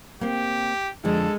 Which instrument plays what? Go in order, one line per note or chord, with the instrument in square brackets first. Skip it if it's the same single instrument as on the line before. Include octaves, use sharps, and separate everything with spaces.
[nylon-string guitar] A#3 C4 [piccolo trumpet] G4
[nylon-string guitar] F2 D3 F3 [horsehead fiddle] G#3 [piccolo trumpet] A4